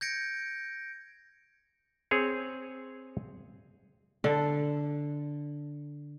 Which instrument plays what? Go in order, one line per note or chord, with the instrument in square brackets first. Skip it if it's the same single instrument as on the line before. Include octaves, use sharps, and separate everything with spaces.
[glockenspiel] G6 G#6 A#6 C#7 D7
[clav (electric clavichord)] C4 G#4 C#5
[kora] D3 A4